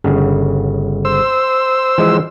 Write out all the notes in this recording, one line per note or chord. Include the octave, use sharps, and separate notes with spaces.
G1 C#3
C5 E6
E3 F3 G#3